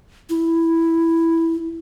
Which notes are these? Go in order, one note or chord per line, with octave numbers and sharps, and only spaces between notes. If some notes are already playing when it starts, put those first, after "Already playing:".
E4